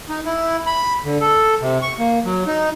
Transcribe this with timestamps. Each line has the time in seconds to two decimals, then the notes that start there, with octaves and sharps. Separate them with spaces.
0.09 D#4
0.25 E4
0.67 B5
1.05 D3
1.21 A4
1.61 C3
1.82 C#6
1.99 A#3
2.24 F#3
2.47 D#4